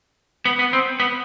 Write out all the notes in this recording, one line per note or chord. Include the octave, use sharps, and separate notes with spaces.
B3
B3
C4
B3